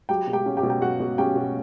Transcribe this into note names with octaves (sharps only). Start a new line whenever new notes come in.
F#3 G4 G5
B2
G4 G5
C#4
G4 G5
B2
G5
F#3 F#4 F#5
B2
C#4 G4 G5
B2